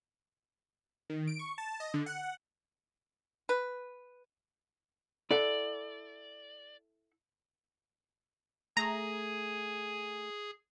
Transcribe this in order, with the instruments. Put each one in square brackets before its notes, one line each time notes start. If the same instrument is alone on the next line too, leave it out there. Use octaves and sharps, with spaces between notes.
[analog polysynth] D#3
D7
C#6
A5
D#5
D3
F#5
F#5
[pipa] B4
[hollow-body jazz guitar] E4 A4 F#5 [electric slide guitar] D5
[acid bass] A3 [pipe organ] G#4 [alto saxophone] G#5 [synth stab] A#5